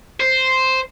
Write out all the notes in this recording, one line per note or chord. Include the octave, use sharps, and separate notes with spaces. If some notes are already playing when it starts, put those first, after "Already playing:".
C5